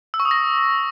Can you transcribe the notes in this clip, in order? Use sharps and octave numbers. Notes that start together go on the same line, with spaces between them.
E6
C#6
D#6
A#6